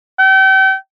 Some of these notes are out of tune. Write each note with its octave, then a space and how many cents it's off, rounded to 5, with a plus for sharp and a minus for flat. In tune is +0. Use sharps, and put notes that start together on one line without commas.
G5 -35